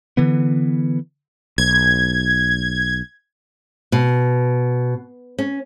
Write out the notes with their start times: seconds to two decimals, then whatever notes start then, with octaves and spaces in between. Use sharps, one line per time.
0.17 D3 E3 B3
1.58 B1 G#6
3.92 B2
5.39 C#4